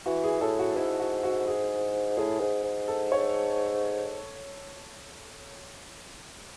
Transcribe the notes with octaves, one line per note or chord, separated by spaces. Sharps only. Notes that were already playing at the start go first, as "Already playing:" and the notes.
E3 F#4
G#4
A2 A4
F#4
G#2 E4
F#4
F#4
G#4
A2 G#4
G#2
G#2
A4
C#5